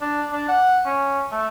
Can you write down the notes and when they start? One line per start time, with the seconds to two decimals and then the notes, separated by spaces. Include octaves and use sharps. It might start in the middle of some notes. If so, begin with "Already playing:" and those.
0.01 D4
0.32 D4
0.49 F#5
0.86 C#4
1.32 A3